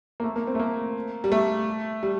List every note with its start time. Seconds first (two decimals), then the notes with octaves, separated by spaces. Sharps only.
0.20 A#3
0.23 A3
0.36 A#3
0.47 C4
0.55 A3
0.60 A#3
1.24 G3
1.32 A3
2.03 G3